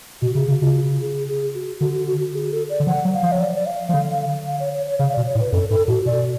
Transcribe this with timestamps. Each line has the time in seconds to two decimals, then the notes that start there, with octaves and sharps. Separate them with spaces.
0.22 B2 F#4
0.35 C#3 G#4
0.48 C#3 F#4
0.62 C#3 F4
1.02 G#4
1.28 G#4
1.54 F#4
1.81 D3 F#4
1.95 F#4
2.08 F#4
2.21 F#4
2.34 G#4
2.51 A4
2.69 D5
2.80 D3
2.87 F3 F#5
3.05 F#3
3.14 F5
3.23 F3
3.32 C#5
3.40 D5
3.56 D5
3.67 F5
3.89 F3
3.94 D3
4.46 F5
4.60 C#5
4.73 C#5
4.86 C#5
4.99 C#3 F5
5.12 D5
5.17 B2
5.26 C#5
5.35 A2
5.40 B4
5.52 F#2 A4
5.70 G#2 A4
5.88 A2 F#4
6.06 B2 D5